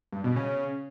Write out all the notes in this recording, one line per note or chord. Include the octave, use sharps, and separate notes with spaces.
G2
B2
C#3